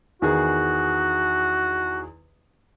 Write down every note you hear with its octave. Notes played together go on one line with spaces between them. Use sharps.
E2 D#3 F#4 G#4